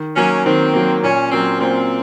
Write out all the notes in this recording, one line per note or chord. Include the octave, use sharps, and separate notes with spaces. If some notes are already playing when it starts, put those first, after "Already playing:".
Already playing: D#3
F#3 A#3 C#4
D#3 C4
F#3 A#3
A#2 C#4
F#3 A#3 C4 C#4
A#2 C4